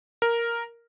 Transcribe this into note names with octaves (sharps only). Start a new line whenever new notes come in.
A#4